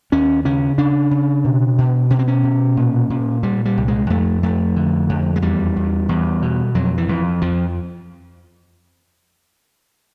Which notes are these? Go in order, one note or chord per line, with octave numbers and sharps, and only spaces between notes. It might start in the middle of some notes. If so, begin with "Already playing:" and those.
D#2 C#4
C#3 C#4
C#3 D4
C#3
B2
B2
B2 C#4
C4
C#4
B2
A#2
A#2
A#2 G3
G3
C2
G#3
F2 A3
F2 A3
D3
F2
G#3
E2 G3
E2
E2
B2
F2 F#3
E3
F2
F2 F3